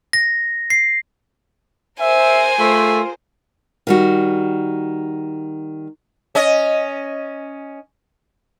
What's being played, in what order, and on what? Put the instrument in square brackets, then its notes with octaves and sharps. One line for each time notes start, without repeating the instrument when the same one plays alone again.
[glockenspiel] A#6
C7
[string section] G#4 A#4 C5 [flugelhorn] E5 [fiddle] G#5
[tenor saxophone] A3 [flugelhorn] F4
[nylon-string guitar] D#3 G3 F#4
[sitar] C#4 D#5